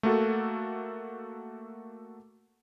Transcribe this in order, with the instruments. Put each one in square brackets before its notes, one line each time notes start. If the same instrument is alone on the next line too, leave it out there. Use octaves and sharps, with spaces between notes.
[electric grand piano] A3 A#3 F#4 A4